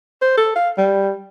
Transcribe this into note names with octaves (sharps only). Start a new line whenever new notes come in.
C5
A4
F5
G3